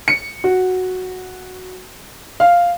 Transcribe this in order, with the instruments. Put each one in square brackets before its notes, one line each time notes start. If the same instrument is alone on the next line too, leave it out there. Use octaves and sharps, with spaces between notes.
[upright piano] C#7
F#4
F5